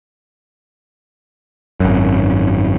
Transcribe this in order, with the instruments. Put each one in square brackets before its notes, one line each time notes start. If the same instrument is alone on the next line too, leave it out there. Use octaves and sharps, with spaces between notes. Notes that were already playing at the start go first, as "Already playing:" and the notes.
[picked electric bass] G#1 F#2